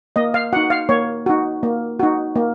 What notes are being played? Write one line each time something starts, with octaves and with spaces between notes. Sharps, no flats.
A#3 D#5
F5
D#4 F#4 F#5
F5
A#3 C#5
D#4 F#4
A#3
D#4 F#4
A#3